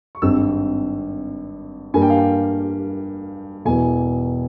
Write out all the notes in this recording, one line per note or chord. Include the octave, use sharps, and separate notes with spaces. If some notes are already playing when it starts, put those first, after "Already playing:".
C#6
G#1 G2 G3 C4 E6
G2 G3 A#3 G#5
G5
F5
G5
E1 E2 E3 G#5